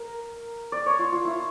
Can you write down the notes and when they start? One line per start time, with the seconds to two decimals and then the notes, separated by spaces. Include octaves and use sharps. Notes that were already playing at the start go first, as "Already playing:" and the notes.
Already playing: A#4
0.72 D5
0.86 C#5
0.99 F4
1.12 F4
1.25 E4